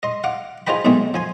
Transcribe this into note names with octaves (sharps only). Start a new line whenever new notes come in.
D#5 C6
F5 F#5 D6
F4 G#4 C5 D#5 G5 B5
B1 G#2 G#3 A3 C4 G#4
F3 G#5 C6